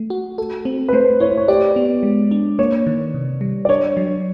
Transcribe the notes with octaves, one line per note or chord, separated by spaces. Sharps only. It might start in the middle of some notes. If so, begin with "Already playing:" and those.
Already playing: A3
F#4
A4
C4
B4
A3 C5
E4 C#5
C5
C#5
G4 D5
B3
G#3
D4
A#3 C#5
D#3
C3
G3
D5
D4 C#5
F#3